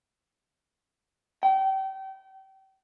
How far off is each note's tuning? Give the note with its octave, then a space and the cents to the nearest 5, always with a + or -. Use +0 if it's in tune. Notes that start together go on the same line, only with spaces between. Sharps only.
G5 -30